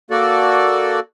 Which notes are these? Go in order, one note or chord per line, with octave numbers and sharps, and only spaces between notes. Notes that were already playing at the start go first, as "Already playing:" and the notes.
A#3 F#4 A4 D5